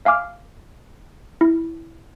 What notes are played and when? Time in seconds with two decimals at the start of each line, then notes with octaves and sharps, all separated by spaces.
0.05 E5 F5 G#5 D6 F6
1.41 E4